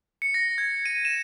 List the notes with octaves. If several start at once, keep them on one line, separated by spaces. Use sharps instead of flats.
C#7
A#6
G#6
D#7
E7